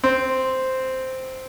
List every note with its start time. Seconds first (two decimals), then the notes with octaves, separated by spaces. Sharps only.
0.04 C4